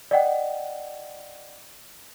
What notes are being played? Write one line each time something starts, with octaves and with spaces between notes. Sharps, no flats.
D5 D#5 F#5 G5